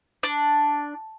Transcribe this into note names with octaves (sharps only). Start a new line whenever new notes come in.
D4